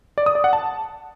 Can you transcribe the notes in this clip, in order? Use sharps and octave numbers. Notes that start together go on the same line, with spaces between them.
D5
D#6
D5
F#5
A5